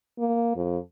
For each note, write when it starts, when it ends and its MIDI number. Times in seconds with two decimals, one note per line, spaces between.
0.19 0.52 58
0.56 0.78 41